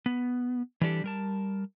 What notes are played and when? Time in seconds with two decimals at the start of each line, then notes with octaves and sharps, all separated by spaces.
0.06 B3
0.81 E3 G3 D4 G4 A4
1.04 G3 A#4 A5